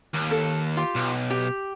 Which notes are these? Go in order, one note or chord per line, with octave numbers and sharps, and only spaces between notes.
D#2
A4
F4 G4
B1
G4